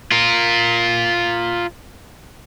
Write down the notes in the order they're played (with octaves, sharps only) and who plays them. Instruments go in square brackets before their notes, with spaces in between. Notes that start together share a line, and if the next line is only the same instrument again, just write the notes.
[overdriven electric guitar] F4 A#4